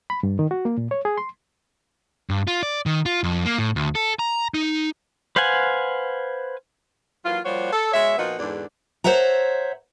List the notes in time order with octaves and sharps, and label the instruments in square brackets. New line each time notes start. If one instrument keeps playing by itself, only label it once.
[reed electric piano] B5
G2
D#3
F#4
A#3
A#2
C#5
G#4
C6
[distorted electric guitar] G2
F4
D5
D#3
F4
F2
A#3
A2
D2
A4
A#5
D#4
[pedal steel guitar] B4 C5 F5 F#5 G#5
[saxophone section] E3 F#3 A#3 F4
F3 G3 A#3 F#4 C5 C#5
A4
B2 G#3 C#5 E5
A#2 F3 B3 D#4 F4 F#4
E2 G#2 D3 D4
[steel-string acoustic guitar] C5 C#5 E5 F#5 A#5